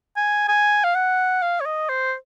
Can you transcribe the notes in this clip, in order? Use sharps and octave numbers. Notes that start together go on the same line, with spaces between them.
G#5
G#5
F5
F#5
F5
C#5
D#5
C5